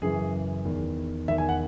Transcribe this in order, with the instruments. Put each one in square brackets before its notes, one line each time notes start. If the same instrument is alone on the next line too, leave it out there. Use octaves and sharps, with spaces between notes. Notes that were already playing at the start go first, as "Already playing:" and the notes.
[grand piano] F#2 C#3 E3 G#4
E2 D#3
E2 D#3 E5
G#5
F#5